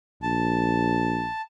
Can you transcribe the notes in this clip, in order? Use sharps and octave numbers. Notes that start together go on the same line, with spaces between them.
A#1 A5